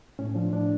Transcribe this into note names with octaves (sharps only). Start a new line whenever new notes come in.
A2 C#4
F3 D4
A2 D4